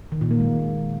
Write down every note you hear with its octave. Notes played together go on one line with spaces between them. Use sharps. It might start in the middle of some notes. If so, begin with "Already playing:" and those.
D#3
A#2
A#3
G#3